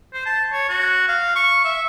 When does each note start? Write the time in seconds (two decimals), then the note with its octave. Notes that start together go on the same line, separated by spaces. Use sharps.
0.13 C5
0.26 A5
0.52 C#5
0.69 F#4
1.08 F5
1.36 C#6
1.65 E5